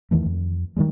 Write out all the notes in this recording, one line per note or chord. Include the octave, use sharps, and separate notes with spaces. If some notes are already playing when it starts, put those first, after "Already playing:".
E2 D#3 E3 A3
F2
D#3 E3 G3 G#3